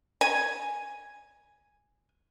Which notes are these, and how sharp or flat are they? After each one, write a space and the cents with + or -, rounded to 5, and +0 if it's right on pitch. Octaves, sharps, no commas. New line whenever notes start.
G#5 -5